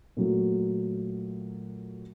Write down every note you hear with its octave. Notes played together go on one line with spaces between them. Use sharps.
A#2 F#3 A3